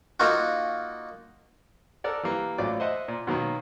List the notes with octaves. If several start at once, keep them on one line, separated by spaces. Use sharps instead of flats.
A#3 D#4 F4 F#4
A4 A#4 D5 F#5
E3 G3 A#3
A1 F#3 F4 D5 D6
C5 D#5 E5 F#5
A#2
B2 D#3 F#3 A#3